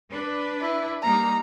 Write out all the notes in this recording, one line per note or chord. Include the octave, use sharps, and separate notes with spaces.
D4 B4
E4
G3 A#3 D#4 A#5